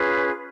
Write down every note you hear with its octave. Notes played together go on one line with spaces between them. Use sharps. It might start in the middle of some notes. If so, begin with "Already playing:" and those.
Already playing: C#4 F4 G#4 B4